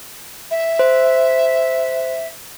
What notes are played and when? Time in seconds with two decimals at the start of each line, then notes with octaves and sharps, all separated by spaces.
0.50 E5
0.79 C5